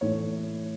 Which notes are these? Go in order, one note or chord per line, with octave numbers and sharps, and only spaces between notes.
A2 E3 A3 C#5